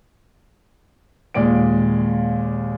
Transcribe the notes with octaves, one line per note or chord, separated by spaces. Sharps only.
D#2 A#2 G#3 D5 D7